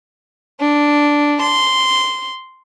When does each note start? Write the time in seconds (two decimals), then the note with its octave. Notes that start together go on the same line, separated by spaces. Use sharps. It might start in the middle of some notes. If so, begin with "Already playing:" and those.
0.60 D4
1.42 C6